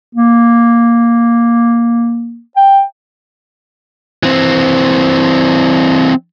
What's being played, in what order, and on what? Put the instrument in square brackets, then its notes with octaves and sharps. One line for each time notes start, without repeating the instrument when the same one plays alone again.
[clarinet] A#3
G5
[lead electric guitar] E3 C4